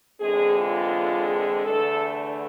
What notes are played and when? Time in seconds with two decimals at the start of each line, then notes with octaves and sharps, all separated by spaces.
0.20 E2 D3 G#3 C4 G#4
0.57 F4
1.28 G#4
1.65 E2 D3 A3 A4